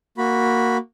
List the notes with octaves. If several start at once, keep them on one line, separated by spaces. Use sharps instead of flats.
A#3 F#4 B5